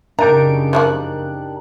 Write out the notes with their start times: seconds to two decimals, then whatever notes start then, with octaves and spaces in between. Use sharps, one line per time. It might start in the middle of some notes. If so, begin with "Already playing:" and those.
0.19 F#2 C#3 D4 D#4 G4 A#4 A#5 D7
0.73 F3 G3 A#3 F#6